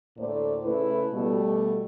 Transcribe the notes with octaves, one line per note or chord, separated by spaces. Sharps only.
D2 A2 A3 A#3 C5 D5
C#3 A3 E4 B4
B2 G3 A3